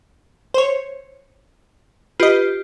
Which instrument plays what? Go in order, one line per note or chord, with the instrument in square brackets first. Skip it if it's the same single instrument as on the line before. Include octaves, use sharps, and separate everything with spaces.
[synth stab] C5 C#5
[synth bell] F4 G4 [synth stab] B4 D#5